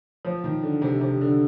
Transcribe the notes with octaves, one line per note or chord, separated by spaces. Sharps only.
F3
D#3
D3
C3
C3
D3